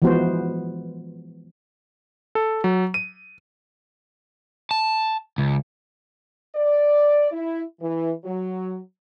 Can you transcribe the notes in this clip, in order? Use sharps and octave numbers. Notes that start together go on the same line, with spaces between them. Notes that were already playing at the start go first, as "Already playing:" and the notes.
E3 F3 G#3 B3 F#4 C5
A4
F#3
D#7
A5
C#2
D5
E4
E3
F#3